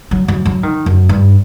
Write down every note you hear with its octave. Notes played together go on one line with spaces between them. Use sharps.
F#3
F#3
F#3
D#3
F#2
G2